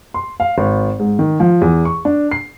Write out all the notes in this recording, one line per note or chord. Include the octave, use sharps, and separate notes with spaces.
C6
F5
G#1
G#2
D#3
F3
E2
C#6
D4
C7